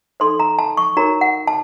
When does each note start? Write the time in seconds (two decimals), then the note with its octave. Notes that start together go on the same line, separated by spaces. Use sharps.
0.20 D#4 A4 C5 C6
0.40 A#5
0.59 A5
0.77 C#6
0.97 D#4 F#4 A#4 C#5 A#5
1.21 F#5
1.47 A5